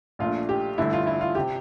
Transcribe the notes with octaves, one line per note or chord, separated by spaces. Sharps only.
A#1 A#2 A3 D4 F4
G4
A1 G2 D3 A3 E4
F4
E4
F4
C3 G4